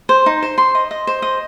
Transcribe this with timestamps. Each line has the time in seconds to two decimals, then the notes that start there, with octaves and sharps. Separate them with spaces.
0.09 C5
0.26 D#4
0.42 C5
0.58 C6
0.75 D#5
0.91 D#5
1.07 C5
1.22 D#5